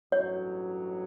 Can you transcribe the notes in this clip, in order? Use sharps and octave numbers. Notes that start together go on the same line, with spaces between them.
A1 G2 F#3 C#5